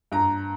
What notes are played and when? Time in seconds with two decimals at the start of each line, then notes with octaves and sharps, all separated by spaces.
0.12 G2 A#5